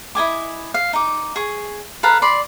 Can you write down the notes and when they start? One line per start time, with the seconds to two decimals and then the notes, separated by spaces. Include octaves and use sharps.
0.15 E4 D#5 G#5 D6
0.74 F5
0.93 D#4 D6
1.36 G#4 C#6
2.03 A4 B4 F5 A#5
2.22 D5 B5 C6